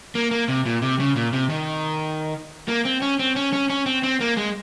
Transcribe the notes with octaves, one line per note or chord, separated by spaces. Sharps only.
A#3
A#3
C3
A#2
C3
C#3
A#2
C3
D#3
A#3
C4
C#4
C4
C#4
C#4
C#4
C4
C4
A#3
G#3